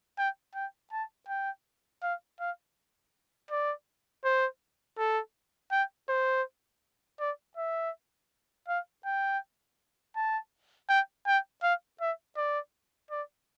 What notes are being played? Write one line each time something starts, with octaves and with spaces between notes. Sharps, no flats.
G5
G5
A5
G5
F5
F5
D5
C5
A4
G5
C5
D5
E5
F5
G5
A5
G5
G5
F5
E5
D5
D5